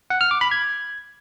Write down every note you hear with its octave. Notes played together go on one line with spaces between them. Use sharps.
F#5
F6
D6
B5
G#6